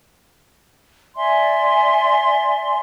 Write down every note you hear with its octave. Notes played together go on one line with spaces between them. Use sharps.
D5 E5 G#5 C6